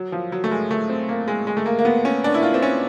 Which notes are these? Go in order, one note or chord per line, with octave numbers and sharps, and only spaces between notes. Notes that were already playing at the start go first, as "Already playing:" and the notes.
Already playing: F#3
F3
F#3
A3
G#3
A3
C4
A#3
G#3
G#3
A3
A#3
A#3
B3
C#4
D4
E4
F4
C4
C#4